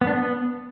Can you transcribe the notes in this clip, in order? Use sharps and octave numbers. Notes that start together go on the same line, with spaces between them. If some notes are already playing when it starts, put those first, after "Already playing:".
B3
D4
B3